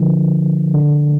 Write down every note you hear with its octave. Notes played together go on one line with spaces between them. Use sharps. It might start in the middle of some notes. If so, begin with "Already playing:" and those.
Already playing: D3 F3
D3